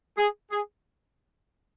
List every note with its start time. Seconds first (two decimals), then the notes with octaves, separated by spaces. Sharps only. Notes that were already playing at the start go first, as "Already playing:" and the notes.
0.18 G#4
0.51 G#4